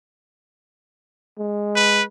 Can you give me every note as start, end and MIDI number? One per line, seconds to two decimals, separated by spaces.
1.39 2.04 56
1.76 2.03 71